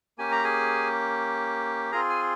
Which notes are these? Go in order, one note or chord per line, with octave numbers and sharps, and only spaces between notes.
A#3 C#4 G4 G#5
A#5
G#4 G#5
C4 F4 G#4 A#4 A#5
G#5